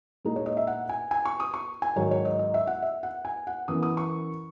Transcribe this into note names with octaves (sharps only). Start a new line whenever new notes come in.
A#2 G#3 D#4
C#5
D#5
E5
F#5
G#5
G#5
C#6
D#6
C#6
G#5
G#2 D#3 F#3 C#5
C#5
D#5
D#5
E5
F#5
E5
F#5
G#5
F#5
F#2 E3 B3 E4 D#6
D#6
C#6